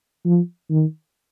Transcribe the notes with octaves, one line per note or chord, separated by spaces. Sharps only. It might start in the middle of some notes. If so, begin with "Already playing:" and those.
F3
D#3